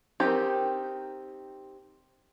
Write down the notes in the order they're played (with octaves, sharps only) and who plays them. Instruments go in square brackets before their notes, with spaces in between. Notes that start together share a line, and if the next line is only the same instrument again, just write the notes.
[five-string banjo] C4 D#4 G4 A#4